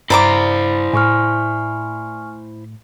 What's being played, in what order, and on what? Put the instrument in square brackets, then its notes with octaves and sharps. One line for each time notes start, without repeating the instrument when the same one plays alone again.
[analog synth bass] G2 [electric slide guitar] E4 C5 [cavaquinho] D5 A#5 D6 [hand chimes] B5 A6
[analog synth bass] A2 [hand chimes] G#5 C#6 F6